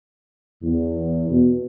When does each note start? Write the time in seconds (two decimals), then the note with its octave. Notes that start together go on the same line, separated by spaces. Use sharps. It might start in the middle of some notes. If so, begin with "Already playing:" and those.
0.63 E2
1.30 B2